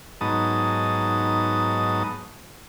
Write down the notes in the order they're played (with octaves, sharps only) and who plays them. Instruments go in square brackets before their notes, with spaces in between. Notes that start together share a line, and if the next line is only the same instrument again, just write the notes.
[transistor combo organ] G#2 F#3 B3 D#4 A5 D#6